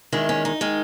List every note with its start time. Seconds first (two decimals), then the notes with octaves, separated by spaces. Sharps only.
0.12 E2 D#3 G#3 E4
0.29 C#4
0.45 D#4
0.61 D#3 G#3